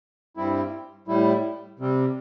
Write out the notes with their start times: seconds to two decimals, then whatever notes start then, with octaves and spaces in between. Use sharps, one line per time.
0.37 G2 G3 C4 E4
1.08 A2 G3 E4
1.79 C3 G3 C4